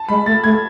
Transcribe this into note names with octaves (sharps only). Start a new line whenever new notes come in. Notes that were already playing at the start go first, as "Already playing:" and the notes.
Already playing: A5
G#3 B5
A3 A6
A3 G#6